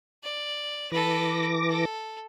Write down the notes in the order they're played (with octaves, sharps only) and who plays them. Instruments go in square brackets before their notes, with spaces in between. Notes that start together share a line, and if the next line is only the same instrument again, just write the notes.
[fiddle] D5
[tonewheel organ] E3 D6 A#6 [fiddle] A4 B4
[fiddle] A4